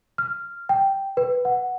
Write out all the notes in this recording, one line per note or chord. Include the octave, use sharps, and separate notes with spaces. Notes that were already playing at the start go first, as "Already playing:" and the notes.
F6
G5
B4
F#5